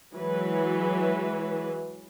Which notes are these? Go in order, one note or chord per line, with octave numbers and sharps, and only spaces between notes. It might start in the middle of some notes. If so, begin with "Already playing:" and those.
E3 F#3 G#3 B4